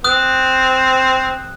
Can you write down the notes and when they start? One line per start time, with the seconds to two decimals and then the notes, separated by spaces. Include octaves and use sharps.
0.04 C4 D#6 F#6